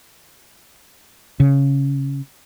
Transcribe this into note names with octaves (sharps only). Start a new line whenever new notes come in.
C#3